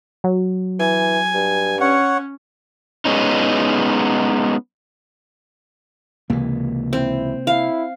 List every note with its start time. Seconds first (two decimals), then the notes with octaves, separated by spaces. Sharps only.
0.24 F#3
0.80 E3 G#5
1.35 G2
1.80 C#4 C#5 F#5
3.05 G#3 B3 C#4 D#4
6.30 C#2 C3 E3 A#3
6.93 C4 E4
7.47 E4 F5